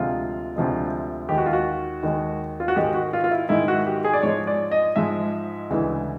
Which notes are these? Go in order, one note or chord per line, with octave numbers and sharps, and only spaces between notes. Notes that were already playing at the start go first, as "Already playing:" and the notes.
Already playing: D2 C3 F3 G#3 F4
D2 C3 F3 G#3
D#2 D#3 G#3 G4
F#4
F4
F#4
D#2 D#3 G#3
F4
F#4
G#2 D#3 G#3 G4
F#4
F4
F4
E4
G#2 D#3 G#3 E4
F#4
G4
G#4
D5
G#2 F3 G#3 C#5
D5
D#5
G#2 F3 G#3 E5
D2 C#3 E3 G#3